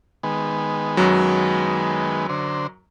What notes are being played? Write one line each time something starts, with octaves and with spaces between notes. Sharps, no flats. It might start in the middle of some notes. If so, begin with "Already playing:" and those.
D#3 G#3 B3
F#2 F#3
D3 C5